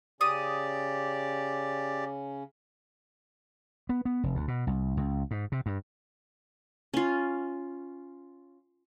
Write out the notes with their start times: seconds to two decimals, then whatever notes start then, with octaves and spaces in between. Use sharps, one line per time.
0.21 C#3 C#4 G4 D5 D#6
3.89 B3
4.05 B3
4.23 F1
4.35 D2
4.48 B2
4.67 C2
4.97 C#2
5.31 G#2
5.52 C3
5.66 G2
6.94 C#4 F4